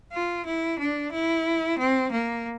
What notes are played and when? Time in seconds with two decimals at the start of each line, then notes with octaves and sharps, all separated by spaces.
0.13 F4
0.46 E4
0.79 D4
1.12 E4
1.79 C4
2.12 A#3